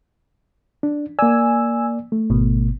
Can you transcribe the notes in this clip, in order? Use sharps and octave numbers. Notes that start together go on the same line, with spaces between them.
D4
A#3 D5 G#5 E6
A3
G#1 B2